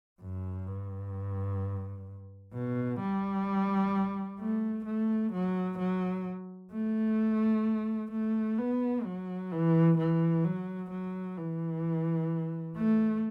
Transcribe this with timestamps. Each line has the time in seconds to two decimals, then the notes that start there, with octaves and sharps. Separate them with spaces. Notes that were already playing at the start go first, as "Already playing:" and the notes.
0.21 F#2
0.67 G2
2.54 B2
3.00 G3
4.39 A3
4.86 A3
5.33 F#3
5.79 F#3
6.72 A3
8.12 A3
8.58 B3
9.05 F#3
9.51 E3
9.98 E3
10.44 F#3
10.91 F#3
11.37 E3
12.77 A3